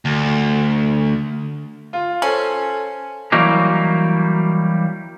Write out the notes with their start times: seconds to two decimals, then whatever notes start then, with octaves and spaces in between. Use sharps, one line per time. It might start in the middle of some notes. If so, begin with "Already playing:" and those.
0.05 D2
1.93 F4
2.22 C#4 A4 C5 F#7
3.32 E3 F#3 G3 A#3 D#4